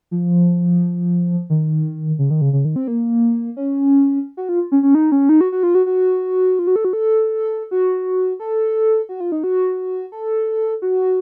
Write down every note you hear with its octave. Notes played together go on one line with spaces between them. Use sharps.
F3
D#3
C#3
D#3
C#3
C#3
D#3
C4
A#3
C#4
F#4
F4
C#4
C#4
D#4
C#4
D#4
F#4
F#4
F4
F#4
F#4
F4
F#4
A4
F#4
A4
F#4
A4
F#4
F4
D#4
F#4
A4
F#4